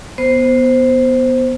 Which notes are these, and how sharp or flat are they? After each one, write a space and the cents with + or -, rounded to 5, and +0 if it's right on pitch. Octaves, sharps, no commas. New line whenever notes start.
B3 +0 C5 +0